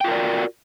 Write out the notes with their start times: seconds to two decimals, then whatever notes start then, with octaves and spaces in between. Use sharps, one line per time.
0.01 G5
0.04 F4
0.08 A#4
0.11 D5
0.15 F#4